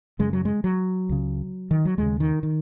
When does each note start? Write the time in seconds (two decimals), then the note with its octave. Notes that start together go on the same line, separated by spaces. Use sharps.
0.19 F#2 C#3 G#3
0.33 F#3
0.45 G#3
0.64 F#3
1.09 C#2 C#3
1.71 D#3
1.85 F#3
1.98 D#2 C#3 G#3
2.20 D#3
2.43 D#3